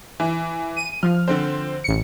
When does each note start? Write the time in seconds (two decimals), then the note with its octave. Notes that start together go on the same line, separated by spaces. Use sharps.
0.20 E3
0.77 D#7
1.03 F3 F6
1.28 D3 C4 C5
1.84 A1 C#7